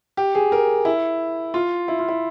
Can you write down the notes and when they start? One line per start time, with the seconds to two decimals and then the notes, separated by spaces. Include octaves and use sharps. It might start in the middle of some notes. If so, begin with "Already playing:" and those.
0.17 G4
0.35 G#4
0.52 A#4
0.85 E4
1.54 F4
1.88 E4
1.99 F4
2.08 E4